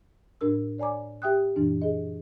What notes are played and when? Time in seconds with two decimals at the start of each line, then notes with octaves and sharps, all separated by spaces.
0.41 A2 D4 A#4 E6
0.78 C#5 D5 G#5 A#5 D6
1.22 G4 E5 G5 D#6 F#6
1.56 F#2 A#2 E3 D4
1.82 G#4 D#5